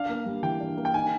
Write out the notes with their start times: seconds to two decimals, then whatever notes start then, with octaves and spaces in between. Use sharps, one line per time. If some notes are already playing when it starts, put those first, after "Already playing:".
Already playing: D4 F5
0.09 A#3
0.26 G3
0.43 E3 G5
0.60 D4
0.77 A#3
0.85 G5
0.94 D#4 G#5